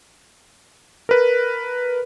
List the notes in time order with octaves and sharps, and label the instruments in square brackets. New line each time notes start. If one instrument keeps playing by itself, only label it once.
[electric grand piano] A#4 B4